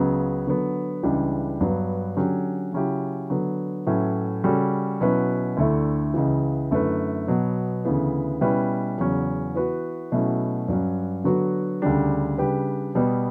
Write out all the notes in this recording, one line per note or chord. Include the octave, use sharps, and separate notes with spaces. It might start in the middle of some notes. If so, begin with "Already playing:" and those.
Already playing: C#2 C#3 F#3 B3
D3 F#3 B3
C#2 C#3 E3 G3 D4
G2 F#3 B3
D3 F#3 C#4 G4
C#3 F#3 C#4 E4 G4
D3 F#3 B3
A2 F#3 C#4 E4 B4
C#3 G3 C#4 F#4 A4
B2 F#3 C#4 E4 B4
D2 D3 A3 E4
C#2 C#3 E3
F#2 D3 A3 E4 B4
B2 F#3 B3
D2 C#3 E3 B3
B2 G3 C#4 E4 B4
E2 C#3 F#3 C#4
E3 B3 F#4 B4
B2 F#3 A3 C#4 E4
G2 F#3 C#4
D3 F#3 B3 F#4 B4
D2 C#3 G3 D4 G4
C#3 G3 D4 G4 B4
B2 G3 B3